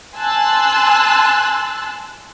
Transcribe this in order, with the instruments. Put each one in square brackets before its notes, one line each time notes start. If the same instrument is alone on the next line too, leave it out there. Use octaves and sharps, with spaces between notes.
[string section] G#5 A5 C6 E6 F#6